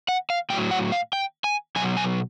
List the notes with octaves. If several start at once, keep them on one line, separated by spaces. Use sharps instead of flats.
F#5
F5
A2 F#3 G5
F#5
F5
G5
G#5
B2 F#3 G#5
G#5